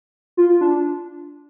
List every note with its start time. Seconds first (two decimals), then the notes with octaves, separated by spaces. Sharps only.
0.37 F4
0.49 F4
0.61 D4